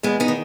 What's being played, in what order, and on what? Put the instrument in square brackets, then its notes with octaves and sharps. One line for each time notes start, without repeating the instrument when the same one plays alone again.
[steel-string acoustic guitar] E2 G#3 B3
B3 D#4
D#3